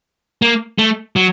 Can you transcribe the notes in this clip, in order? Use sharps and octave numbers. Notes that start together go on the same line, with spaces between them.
A#3
A3
F#3